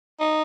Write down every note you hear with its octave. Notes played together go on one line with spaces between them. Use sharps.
D#4